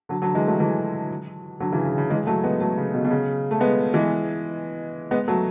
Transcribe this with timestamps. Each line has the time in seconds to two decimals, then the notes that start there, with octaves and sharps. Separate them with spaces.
0.09 D3 F#3
0.22 D3 F#3
0.35 E3 G#3
0.47 F#3 A3
0.60 E3 G#3
1.60 D3 F#3
1.72 C#3 E3
1.85 C#3
1.98 C#3
2.10 E3 G#3
2.27 F#3 A3
2.43 G#3 B3
2.60 F#3 A3
2.77 C#3
2.94 B2
3.05 B2
3.11 C#3
3.51 A3
3.60 G#3 B3
3.94 E3 G#3
5.11 G#3 B3
5.28 F#3 A3